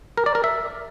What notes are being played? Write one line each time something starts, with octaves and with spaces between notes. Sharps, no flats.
A#4
D5
A#4
E5